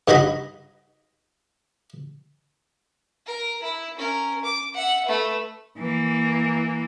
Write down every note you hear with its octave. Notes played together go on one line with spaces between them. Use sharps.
G2 D#4 F#4 D#5 B5
A#4
E4
C#4 A#4
D6
E5 F#5
A3 B4
E3 A#3